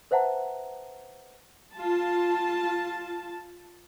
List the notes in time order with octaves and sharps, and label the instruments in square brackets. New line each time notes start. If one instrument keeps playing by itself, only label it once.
[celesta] B4 C5 E5 F#5 A5 A#5
[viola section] F4 A5